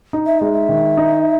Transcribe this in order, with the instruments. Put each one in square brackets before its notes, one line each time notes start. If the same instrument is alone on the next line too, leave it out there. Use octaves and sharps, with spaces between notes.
[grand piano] D#4
[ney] E5
[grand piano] G#3 [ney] D#5
[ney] E5
[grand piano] D#3
D#4